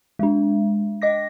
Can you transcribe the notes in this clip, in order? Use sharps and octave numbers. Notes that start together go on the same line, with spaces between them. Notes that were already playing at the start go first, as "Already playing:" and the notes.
G#3 D4
D#5 D6 A#6